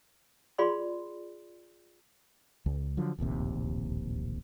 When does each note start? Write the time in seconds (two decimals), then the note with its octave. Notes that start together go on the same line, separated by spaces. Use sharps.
0.58 F4 G#4 D5 B5 C6
2.66 C#2
2.97 D3 F3 F#3
3.18 D1 A#1 D#2 C3